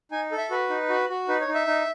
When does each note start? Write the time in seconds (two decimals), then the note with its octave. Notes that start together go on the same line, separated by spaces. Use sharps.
0.11 D#4 G#5
0.31 A4
0.38 E5
0.51 F#4 B4
0.70 D#4
0.89 F#4
1.09 F#4
1.28 D#4 B4
1.41 C#5
1.48 D#4
1.54 E5
1.67 D#4